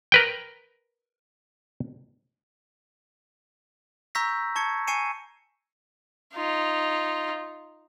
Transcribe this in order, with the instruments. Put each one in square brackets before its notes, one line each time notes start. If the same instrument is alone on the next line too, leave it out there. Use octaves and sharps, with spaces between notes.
[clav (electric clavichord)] A#4 B4 G5
[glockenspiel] A#5 C#6 E6 G6 A#6 B6
A5 C#6 G#6 C#7
G#5 C#6 C7 C#7 D#7 E7
[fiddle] D#4 F4